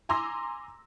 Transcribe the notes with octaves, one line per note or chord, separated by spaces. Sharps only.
G#5 A#5 C6 D6 E6 A#6